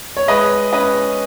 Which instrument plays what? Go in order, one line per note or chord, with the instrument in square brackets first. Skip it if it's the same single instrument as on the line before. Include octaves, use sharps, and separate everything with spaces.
[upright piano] C#5
G#3 B4 D#5
C#4 B4 D#5